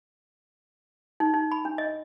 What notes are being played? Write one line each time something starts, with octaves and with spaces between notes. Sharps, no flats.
D#4
D#4
B5
D4
D#5